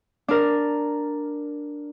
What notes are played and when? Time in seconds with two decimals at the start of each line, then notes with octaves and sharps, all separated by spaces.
0.28 D4 A#4